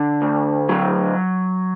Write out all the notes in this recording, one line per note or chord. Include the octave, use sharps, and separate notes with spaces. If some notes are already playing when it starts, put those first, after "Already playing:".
Already playing: D3
D2
F#3